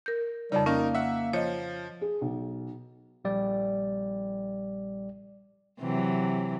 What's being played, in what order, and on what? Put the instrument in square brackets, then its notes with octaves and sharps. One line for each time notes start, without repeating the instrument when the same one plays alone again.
[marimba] A#4 G6
[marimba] F2 C#3 [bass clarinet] G3 [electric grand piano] D#4
[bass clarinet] A#3 [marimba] C#4 [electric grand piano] D#4 A#4
[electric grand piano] E5 F#5
[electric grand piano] F3 [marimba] C#5 D#5
[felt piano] G#4
B1
[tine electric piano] A#1 G3 D5
[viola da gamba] C3 E3 F#3